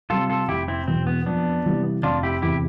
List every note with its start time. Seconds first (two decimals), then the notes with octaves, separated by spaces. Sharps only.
0.10 C3 G3 C4 F4 A4
0.30 F4 A4
0.48 F1 E4 G4
0.68 C4 E4
0.87 E2 B2 C4
1.07 B3
1.26 F2 B3 D4
1.66 C3 E3 G3
2.03 F1 D4 F4
2.23 E4 G4
2.42 E2 C3 E4 G4